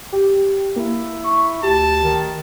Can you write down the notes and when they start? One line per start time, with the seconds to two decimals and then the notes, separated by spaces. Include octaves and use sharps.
0.12 G4
0.76 A#3 E4
1.24 C#6
1.63 D2 G4 A5
2.03 D#3